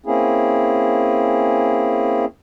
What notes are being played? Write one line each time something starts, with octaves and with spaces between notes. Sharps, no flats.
A#3 C4 C#4 E4 G#4